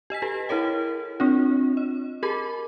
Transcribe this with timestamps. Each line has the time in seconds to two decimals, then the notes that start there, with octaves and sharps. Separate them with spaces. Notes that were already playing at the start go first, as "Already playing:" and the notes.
0.10 G4 D#5 G#5 B6
0.22 G4 A4 B4
0.49 E4 G#4 A#4 C#5 G5
1.20 C4 D4 F4
1.77 D#5
2.23 G4 G#4 A#4 B5 D6